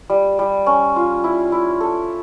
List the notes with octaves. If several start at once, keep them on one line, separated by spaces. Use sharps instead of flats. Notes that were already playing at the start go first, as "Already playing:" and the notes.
G3
G3
C#4
F4
E4
E4
A4